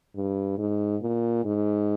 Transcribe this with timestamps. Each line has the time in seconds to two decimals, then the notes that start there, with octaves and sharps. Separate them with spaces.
0.16 G2
0.58 G#2
1.02 A#2
1.45 G#2